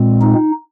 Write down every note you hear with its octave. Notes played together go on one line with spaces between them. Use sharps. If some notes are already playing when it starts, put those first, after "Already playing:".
Already playing: A#2 G#3 C4
D#4